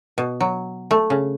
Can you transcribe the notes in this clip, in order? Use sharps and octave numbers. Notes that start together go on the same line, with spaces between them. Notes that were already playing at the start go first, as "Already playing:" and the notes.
B2
F#3
A3
C#3